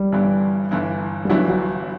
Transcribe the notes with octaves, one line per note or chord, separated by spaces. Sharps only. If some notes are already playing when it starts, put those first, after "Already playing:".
Already playing: G3
G1 G2 E3 B3 E4
G1 G2 E3 B3 E4
G3
G1 G2 E3 F#3 B3 E4
F#3